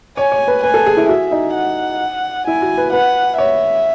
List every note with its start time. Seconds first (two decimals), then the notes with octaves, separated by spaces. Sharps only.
0.17 C#5 G#5
0.32 C#5
0.48 B4
0.64 B4 G#5
0.74 A4
0.86 G#4
0.97 E4
1.09 F#4 E5
1.31 D#4
1.55 F#5
2.47 E4 G#5
2.62 F#4
2.77 B4
2.93 B4 F#5
3.38 C#5 E5